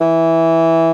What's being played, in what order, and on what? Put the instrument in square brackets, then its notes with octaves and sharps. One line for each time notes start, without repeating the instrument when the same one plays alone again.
[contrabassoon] E3